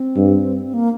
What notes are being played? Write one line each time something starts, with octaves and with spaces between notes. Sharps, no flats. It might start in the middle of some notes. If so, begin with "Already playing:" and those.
Already playing: C4
G2
A#3